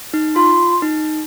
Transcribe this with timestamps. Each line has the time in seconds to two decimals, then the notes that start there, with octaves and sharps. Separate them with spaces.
0.14 D#4
0.36 F4 C6
0.82 D#4